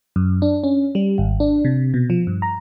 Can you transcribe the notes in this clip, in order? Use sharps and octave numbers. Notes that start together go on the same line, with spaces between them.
F#2
D4
C#4
G3
G#1
D4
C3
B2
F3
G2
A#5